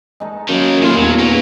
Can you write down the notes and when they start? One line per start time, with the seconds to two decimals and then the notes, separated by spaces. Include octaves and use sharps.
0.20 G#3 D#4 A4
0.48 F#2 D#3 A#3 G#4
0.83 D#1 A2 A3 F4 G#4
0.96 E2 F#3
1.19 A#3 B3 F4 F#4